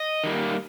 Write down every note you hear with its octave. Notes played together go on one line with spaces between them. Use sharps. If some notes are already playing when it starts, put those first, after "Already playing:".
Already playing: D#5
D#3 G3 A#3